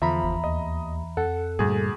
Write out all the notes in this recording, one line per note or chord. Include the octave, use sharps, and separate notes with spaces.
E2 D3 F3 E5 A#5 B5
G1
D#2 D#5
F2 A4 F#5
D2 G2 A#2 G3 G#4